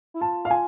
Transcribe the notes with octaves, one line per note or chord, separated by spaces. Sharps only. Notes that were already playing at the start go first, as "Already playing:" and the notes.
E4
F4 A5
F5
F4 G#5